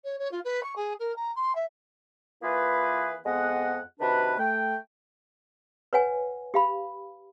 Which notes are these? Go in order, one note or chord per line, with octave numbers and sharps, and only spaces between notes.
C#5
C#5
F4
B4
C#6
G#4
A#4
A#5
C6
E5
E3 A#3 E4 F4 G#4 B4
F2 G#3 B3 D#5 F#5
C3 D#3 D4 F#4 B4
A3 G5
B4 C#5 F#5 G#5
G4 F5 B5